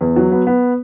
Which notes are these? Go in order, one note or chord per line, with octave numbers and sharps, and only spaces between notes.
E2
F#3
B3
B3